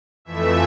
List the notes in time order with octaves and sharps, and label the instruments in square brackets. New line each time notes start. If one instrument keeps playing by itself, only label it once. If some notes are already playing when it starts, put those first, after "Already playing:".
[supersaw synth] F2 E3 A3 E5